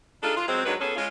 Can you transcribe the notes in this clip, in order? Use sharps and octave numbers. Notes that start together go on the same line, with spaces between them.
D4 D#4 F4 G#4 A4
F4
F#3 G#3 C4
D#3 F#3 G#3 D4 B4
B3 C#4 G#4 A4
G#3 C#4 F4